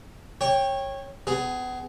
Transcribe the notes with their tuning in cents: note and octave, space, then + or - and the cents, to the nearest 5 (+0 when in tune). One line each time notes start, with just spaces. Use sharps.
C#5 -15 G5 +10
B3 +30 G#4 +0